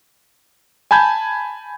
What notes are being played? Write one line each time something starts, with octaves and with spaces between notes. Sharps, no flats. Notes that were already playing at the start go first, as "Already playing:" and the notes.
G#5 A5 B5 G6 G#6